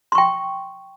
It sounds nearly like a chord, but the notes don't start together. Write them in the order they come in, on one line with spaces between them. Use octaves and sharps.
C6 C#6 G5